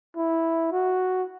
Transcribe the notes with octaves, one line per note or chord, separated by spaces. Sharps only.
E4
F#4